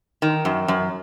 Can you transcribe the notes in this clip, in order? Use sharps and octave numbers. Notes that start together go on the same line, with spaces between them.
D#3
F#2
F#2